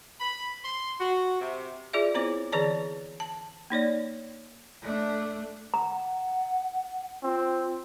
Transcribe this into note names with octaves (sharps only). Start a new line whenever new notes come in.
B5
C6
F#4
C3
F4 G#4 D5 E5
B3 C4 E4 C5 C#5 D6
D3 E3 G#4 C#5 D5 A5
A5
A#3 D#4 C#5 D5
A3 D4
F#5 A#5
C4 F4